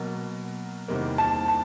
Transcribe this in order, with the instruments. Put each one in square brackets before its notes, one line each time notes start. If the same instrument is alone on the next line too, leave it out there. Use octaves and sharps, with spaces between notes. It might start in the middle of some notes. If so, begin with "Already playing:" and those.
Already playing: [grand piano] B2 F#3 A#3
E2 C3 D#3 G3 A#3
[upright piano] A5
A5